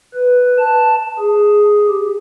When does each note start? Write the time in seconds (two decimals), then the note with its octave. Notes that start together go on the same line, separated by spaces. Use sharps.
0.15 B4
0.59 A5
1.19 G#4
1.88 G4